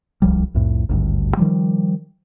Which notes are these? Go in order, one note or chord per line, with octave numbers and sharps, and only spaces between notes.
D1 C2 F3 G3
C2 F2 A2
G#1 D2 G2
D#3 F3 G3